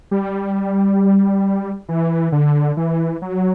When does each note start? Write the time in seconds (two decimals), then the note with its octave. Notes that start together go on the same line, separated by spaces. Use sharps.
0.11 G3
1.89 E3
2.32 D3
2.77 E3
3.22 F#3